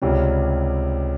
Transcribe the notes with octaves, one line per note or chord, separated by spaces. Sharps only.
C#2 C3 G3 C#4